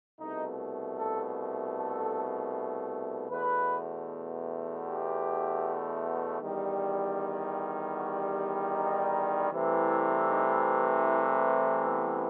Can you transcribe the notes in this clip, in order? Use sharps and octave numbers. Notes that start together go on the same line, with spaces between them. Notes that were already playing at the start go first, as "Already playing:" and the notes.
C2 B2 A3 D#4
A4
A4
E2 B2 A3 B4
G4
E2 D#3 G3
F#4
D#4
C2 C3 E3 A3
D#4
B3